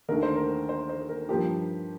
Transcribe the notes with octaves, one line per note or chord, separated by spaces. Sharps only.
D#2 D3 A3 A#4
C5
A#4
C5
C5
A#4
G2 F3 A#3 G4